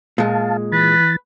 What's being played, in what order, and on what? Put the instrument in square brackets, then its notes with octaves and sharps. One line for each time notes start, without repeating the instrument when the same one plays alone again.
[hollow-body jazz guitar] A#2 G#3 [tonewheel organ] F5 A5
[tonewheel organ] E3 A6 [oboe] B4